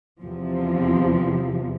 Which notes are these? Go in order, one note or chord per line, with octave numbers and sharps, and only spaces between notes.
E2 C3 F3